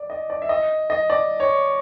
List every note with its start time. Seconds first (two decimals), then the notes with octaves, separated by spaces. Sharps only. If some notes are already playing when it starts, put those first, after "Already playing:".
Already playing: D5
0.10 D#5
0.30 D5
0.42 E5
0.49 D#5
0.90 D#5
1.10 D5
1.40 C#5